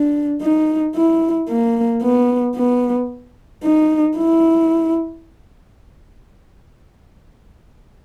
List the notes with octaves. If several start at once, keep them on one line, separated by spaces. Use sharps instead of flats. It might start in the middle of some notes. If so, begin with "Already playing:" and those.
Already playing: D4
D#4
E4
A#3
B3
B3
D#4
E4